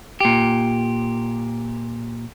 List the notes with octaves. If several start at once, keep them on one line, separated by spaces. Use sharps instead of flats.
A#2 G4